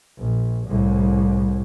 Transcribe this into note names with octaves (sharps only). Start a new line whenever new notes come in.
A#1
C2 A2